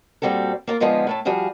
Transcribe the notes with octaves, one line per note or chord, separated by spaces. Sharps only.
A#2 G3 C4 F#4 A4
A#3 F4 A#4
D3 F3 G#3 B3 D#4 F4
A2 A3 A5
F3 G3 F#4 G#4 F5